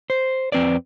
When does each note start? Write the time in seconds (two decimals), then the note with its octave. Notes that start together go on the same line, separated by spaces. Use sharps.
0.10 C5
0.52 F2 C4 B4 D5